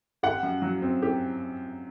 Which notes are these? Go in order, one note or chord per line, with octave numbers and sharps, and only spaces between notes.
G4 F#5
F#2
F#3
C4
G4